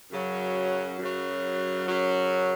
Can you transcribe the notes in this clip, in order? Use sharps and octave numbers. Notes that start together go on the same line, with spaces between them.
F#2 C#3 F#3
F#2 C#3 F#3
F#2 C#3 F#3